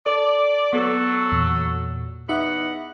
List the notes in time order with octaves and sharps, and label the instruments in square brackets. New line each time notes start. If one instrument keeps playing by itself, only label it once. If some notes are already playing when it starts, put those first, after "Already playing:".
[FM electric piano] A4 [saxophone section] D5
[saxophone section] F#3 A4 [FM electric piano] B3
[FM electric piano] E2 A#2
[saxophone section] E2 B3 F#5 [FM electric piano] D#4 E5